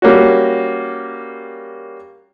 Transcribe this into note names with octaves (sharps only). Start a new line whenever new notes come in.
G3 A#3 C#4 F#4